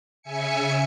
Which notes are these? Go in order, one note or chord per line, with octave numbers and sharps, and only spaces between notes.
C#3 E5 G#5 C#7